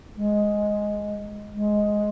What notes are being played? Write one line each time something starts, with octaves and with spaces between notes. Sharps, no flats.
G#3
G#3